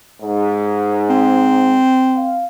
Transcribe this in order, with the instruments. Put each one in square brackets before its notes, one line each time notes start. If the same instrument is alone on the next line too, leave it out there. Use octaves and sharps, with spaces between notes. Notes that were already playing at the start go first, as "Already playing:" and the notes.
[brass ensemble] G#2
[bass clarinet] C4
[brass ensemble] F5